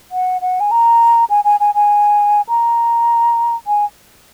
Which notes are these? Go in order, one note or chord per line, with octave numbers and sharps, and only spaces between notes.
F#5
F#5
G#5
A#5
G#5
G#5
G#5
G#5
A#5
G#5